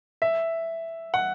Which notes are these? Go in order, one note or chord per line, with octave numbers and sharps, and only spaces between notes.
E5
F#5